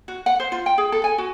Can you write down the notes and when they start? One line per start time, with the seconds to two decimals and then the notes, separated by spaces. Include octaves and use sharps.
0.08 F#4
0.26 F#5
0.40 C5
0.52 F4
0.66 G5
0.78 G#4
0.92 A4
1.04 G#5
1.18 F#4